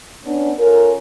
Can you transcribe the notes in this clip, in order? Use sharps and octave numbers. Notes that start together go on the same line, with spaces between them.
B3 C#4 D4
C#4 F4 A4 A#4